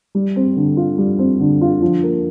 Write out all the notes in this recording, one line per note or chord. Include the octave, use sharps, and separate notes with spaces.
G3
C4
D3
F4
G3
C4
D3
F4
F3
A#3